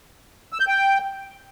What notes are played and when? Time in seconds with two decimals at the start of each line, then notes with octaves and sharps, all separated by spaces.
0.53 E6
0.60 G6
0.68 G5